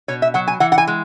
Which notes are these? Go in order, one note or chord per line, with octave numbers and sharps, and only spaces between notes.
B2 C#5
E5
F#3 F#5
G#5
E3 F#5
F#5
G#5
G#3